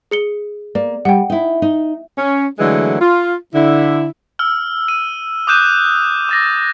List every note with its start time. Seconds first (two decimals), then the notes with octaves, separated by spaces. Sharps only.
0.11 G#4 C#7 G7
0.75 A#3 D5
1.05 G3 F#5 G5
1.30 D#4 E4
1.62 D#4
2.17 C#4
2.59 D3 E3 F#3 G#3 A3
3.01 F4
3.55 D3 E4
4.39 E6 F6
4.88 D#7
5.47 D6 D#6 F#6 G6 D#7 E7
6.29 D6 A6 A#6